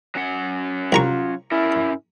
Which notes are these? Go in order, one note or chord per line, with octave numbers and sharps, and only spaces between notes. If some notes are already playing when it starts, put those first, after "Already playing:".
F#3 C#4 F#5
C2 F4 A#5 C#6
C#4 E4 A#4